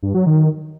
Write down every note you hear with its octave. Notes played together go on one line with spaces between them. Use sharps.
G2
F#3
D#3